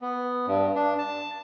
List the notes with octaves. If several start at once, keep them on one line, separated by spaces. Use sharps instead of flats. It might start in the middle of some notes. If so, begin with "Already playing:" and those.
B3
G2
D4
A5